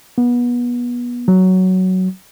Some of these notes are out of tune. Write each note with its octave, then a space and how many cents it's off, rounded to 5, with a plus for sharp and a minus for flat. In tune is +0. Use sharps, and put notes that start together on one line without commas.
B3 -25
F#3 +10